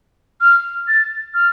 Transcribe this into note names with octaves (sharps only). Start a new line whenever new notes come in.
F6
A6
F6